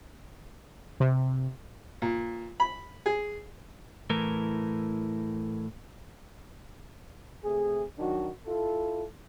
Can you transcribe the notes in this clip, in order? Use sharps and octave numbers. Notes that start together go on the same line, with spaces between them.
C3
A#2
B5
G#4
A2 E3 A#4
C3 A3 G#4
D#3 F#3 D4 D#4 F#4
E4 F4 A4